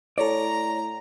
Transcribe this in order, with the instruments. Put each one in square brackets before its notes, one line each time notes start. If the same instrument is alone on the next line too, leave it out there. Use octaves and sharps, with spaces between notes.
[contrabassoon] A2 [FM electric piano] A4 C#5 [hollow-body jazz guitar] D5 [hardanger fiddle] A#5